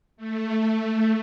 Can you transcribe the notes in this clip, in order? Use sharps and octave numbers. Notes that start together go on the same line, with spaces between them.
A3